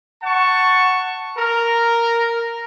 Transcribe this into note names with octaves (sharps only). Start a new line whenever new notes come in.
F#5 A5 C#6
A#4